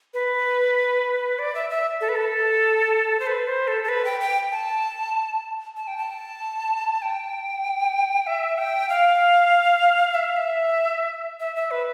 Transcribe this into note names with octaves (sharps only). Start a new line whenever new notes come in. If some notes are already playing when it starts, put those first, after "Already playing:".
B4
D5
E5
E5
A4
B4
A4
C5
B4
C5
A4
A4
B4
G5
G5
A5
A5
G5
A5
G5
E5
G5
F5
E5
F5
E5
E5
E5
B4